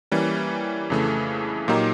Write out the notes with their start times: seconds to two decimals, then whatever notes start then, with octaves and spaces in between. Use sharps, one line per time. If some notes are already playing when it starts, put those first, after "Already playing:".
0.12 E3 G3 A#3 C#4
0.90 F2 C#3 E3 A3
1.68 A#2 F#3 A#3 D#4 G4